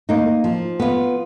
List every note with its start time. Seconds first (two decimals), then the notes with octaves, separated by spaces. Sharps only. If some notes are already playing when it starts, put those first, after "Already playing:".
0.09 A#3 D#4
0.44 F3
0.80 B3 F4